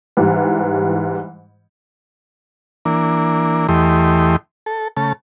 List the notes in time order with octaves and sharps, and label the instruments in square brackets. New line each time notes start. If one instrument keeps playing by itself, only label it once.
[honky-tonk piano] G#2 E3 G3
[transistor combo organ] E3 A#3 D4
E2 E3 A3 G4 D#5 C6
A4
C#3 A3 A5